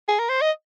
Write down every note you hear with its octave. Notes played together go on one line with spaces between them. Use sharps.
G#4
A#4
C5
D#5